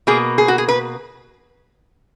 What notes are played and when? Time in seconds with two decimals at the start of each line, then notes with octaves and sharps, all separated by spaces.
0.07 B2 A#3 G#4
0.38 G#4
0.48 F#4
0.58 G#4
0.68 B4